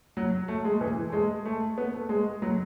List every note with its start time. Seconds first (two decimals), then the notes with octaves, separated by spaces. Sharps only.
0.17 F#3
0.48 A3
0.64 G#3
0.81 E3
1.09 A3
1.12 G#3
1.45 A3
1.78 B3
1.94 A3
2.09 G#3
2.42 F#3